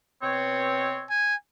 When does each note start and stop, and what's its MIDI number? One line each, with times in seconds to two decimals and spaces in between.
0.22 1.02 47
0.22 1.02 60
0.22 1.02 73
1.10 1.35 80